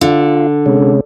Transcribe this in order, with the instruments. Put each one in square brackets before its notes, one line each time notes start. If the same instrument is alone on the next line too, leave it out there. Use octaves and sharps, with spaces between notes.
[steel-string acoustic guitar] D3 [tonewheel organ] F4
[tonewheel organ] C3 G#3 C#4